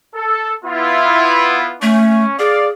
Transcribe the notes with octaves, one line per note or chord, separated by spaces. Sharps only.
A4
B3 E4 F4
A3 C#4
G#4 D5 F5